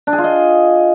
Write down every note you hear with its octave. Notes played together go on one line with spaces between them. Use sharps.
D4
G#4
F4
D#5